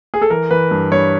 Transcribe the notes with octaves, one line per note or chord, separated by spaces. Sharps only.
G#4
A4
E3 A#4
E3 B4
G2
G2 C#5